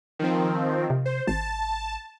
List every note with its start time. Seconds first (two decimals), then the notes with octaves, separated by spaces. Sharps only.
0.19 D#3 F3 C4
0.90 C3
1.05 C5
1.27 G#1 A5